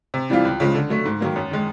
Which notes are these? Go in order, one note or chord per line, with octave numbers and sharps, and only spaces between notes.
C3
E3 G3 C4 F4
C#2
C#3 F3 G#3
D3
F#3 A3
G#2
D#3 F#3 A#3
F#2
D#3 G#3